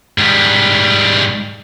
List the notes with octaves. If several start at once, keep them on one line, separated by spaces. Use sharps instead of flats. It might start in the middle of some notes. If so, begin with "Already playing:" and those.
G#2 G3